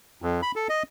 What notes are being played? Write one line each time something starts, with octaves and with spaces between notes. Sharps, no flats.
F2
B5
A4
D#5